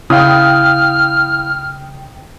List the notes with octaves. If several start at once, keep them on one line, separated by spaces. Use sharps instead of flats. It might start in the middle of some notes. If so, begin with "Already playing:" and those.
C#3 E4 F5 G5 D#6 F6